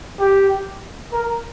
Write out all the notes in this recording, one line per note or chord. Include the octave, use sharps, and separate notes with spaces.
G4
A#4